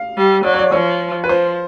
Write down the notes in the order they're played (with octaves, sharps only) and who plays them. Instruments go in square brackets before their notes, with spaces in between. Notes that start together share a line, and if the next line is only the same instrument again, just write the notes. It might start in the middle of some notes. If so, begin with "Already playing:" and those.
Already playing: [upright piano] F5
[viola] G3
[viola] F#3 [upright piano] D5
[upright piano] C#5
D5
[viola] F3 [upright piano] C#5
[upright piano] B4
[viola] F3 [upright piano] C5